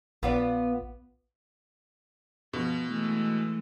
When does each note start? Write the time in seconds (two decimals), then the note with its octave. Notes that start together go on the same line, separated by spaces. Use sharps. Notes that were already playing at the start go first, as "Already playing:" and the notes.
0.23 A#1 B3 F4 D5
2.53 B2 F3
2.87 E3 G#3 A3